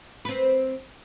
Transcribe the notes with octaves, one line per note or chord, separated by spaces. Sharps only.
C4 B4